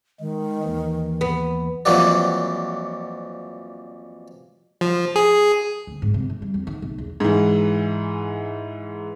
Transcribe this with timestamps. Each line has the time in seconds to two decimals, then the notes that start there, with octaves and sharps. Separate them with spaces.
0.20 D#3 G#3
0.64 D#2 E3
1.21 B3
1.85 F2 A#2 E3 F#3 G3
4.81 F3
5.16 G#4
5.87 D2
6.02 G#2
6.14 C3
6.30 D#3
6.42 G3
6.54 F2
6.67 D#3
6.82 B1
6.98 E2
7.20 G#2 E3